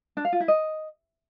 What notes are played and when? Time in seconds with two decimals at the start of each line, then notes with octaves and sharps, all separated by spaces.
0.17 D4
0.25 F5
0.33 F4
0.40 E4
0.48 D#5